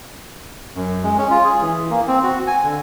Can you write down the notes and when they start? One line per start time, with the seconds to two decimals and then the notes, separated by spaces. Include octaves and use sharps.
0.76 F#2
1.03 G#3
1.18 C#4
1.30 F4
1.44 G#4
1.62 E3
1.90 A#3
2.08 C4
2.23 F#4
2.47 G#5
2.63 D3